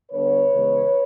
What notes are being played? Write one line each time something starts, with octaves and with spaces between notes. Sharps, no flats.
D3 G3 B3 B4 C#5
C#3 E3 G#3 B3